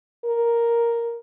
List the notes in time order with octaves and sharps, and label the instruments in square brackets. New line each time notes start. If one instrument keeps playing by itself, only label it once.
[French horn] A#4